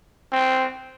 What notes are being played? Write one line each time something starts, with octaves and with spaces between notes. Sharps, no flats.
C4